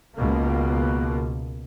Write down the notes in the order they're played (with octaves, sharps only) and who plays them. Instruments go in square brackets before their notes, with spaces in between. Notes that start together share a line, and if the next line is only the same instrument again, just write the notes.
[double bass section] C#2 B2 A#3